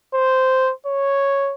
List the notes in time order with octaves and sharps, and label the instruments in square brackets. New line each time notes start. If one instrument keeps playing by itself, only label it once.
[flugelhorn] C5
C#5